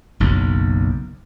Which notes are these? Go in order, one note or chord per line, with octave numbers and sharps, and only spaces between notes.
F#1 B1 F#2